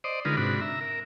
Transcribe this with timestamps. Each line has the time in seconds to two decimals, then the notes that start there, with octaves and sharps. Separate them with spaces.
0.04 C5 D5 D#5
0.25 D3 G#3 D#4 F4 A#4 B4
0.37 G#2 C3 D4 F#4 B5
0.61 E5 A#5
0.81 A#4